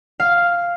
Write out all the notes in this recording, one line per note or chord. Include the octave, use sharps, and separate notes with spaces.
F5